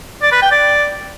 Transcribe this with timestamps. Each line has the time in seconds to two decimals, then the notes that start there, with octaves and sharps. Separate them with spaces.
0.22 D5
0.32 B4
0.42 G5
0.52 D5